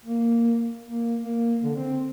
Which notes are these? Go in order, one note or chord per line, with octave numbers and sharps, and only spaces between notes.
A#3
A#3
A#3
D3
C4